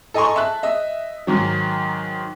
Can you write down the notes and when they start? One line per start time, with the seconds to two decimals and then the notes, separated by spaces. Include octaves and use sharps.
0.14 A4 D#5 G#5 A#5 C6 C#6
0.36 E5 A5 F#6
0.63 D#5 E5
1.27 G#2 D#3 F#3